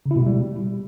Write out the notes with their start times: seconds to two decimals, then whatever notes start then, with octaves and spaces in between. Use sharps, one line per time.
0.06 C#3
0.11 E4
0.16 B2
0.21 G#3
0.27 G3